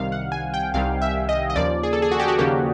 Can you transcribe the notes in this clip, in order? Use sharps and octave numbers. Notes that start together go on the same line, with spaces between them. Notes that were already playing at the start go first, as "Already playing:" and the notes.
Already playing: C2 C3 D#3 G3 F5
F#5
G#5
G5
C2 C3 D#3 G3 F5
E5
D#5
D#5
D#2 C#3 F3 A#3 D5
G#4
A4
G#4
F#4
G4
F#4
D#2 C#3 F3 A#3 G4